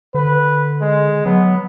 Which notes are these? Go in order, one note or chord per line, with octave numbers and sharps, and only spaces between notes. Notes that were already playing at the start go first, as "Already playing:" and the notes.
D3 B4
G#3
F#3 B3